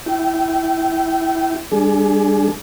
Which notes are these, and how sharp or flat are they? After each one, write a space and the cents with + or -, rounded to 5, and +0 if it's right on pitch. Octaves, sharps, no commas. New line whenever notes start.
E4 +0 G5 -25
G3 +25 D4 +5 G#4 +30